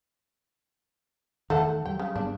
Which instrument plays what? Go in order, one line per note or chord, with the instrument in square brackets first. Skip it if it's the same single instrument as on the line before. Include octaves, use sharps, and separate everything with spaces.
[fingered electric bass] E2 D#3 [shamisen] A3 A4 F#5
[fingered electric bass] F#3 G3 [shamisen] G5
[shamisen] C#3
[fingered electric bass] G2 G3 B3 [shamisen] D4